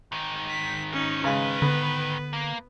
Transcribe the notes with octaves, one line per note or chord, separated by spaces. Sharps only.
G#2 D#3
B6
C#4 D#4
C#3 G#3 B4
D3 B3
A#3